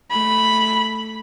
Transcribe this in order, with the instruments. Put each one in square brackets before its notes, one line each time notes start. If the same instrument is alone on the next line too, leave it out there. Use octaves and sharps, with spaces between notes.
[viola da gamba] A3 [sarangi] B5